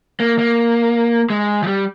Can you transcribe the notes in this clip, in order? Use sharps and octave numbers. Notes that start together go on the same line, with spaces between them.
A#3
A#3
G#3
F3
G3